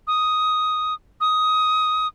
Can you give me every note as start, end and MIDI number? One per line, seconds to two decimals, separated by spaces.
0.07 0.94 87
1.20 2.07 87